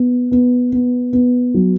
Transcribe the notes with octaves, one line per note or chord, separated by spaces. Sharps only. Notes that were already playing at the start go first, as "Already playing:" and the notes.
Already playing: B3
B3
B3
B3
F#3